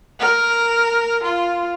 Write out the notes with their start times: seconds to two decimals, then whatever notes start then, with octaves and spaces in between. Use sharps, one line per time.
0.20 A#4
1.23 F4